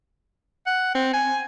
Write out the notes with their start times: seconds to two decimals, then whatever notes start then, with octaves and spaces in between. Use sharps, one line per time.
0.67 F#5
0.95 C4
1.14 G#5